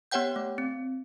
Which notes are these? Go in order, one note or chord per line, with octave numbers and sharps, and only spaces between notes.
B3 G4 C#5 F#5 G5 G6
A3
C4